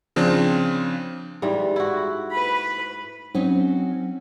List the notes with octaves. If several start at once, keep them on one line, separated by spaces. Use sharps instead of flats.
C#3 F3 C4 D4
G#2 E3 G3
E4 F#4
B4 B5
F#3 C4 C#4 D#4